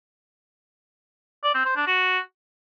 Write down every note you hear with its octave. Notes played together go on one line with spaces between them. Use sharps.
D5
C4
C5
D4
F#4